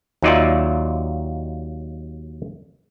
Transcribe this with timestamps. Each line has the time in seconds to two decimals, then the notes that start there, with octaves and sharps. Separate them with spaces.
0.23 D#2 F#3 D#4 F4 D5 E5